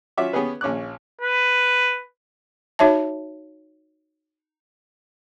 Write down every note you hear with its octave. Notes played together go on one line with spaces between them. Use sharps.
F#3 C#4 F4 E5 F#5 D6
B3 C#4 G4 G#4 B4
A#1 C#4 D6 F#6
B4
D#4 F#4 C#5 E5 A5